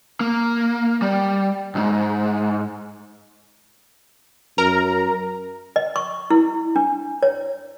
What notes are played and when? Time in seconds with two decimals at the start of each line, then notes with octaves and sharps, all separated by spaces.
0.21 A#3
1.02 G3
1.75 B1 G#2
4.58 F#2 A#4 A#5
5.76 D#5
5.96 C#6
6.30 E4
6.76 D4
7.23 C#5